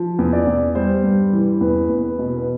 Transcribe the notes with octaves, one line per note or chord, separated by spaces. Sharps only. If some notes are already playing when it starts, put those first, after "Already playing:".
Already playing: F3
E2
D5
E2
G3 C5
G2
E3
E2 B4
E2
B4
B2
B4